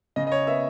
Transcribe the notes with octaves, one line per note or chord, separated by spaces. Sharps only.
C#3 D#5
D#5
C#5
B3 E5